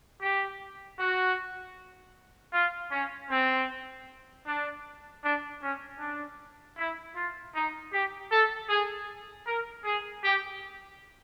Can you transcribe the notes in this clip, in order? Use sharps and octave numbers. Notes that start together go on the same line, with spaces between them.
G4
F#4
F4
C#4
C4
D4
D4
C#4
D4
E4
F4
D#4
G4
A4
G#4
A#4
G#4
G4